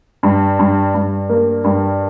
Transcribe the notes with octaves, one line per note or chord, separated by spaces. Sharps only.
G2
G2
G2
A#3
G2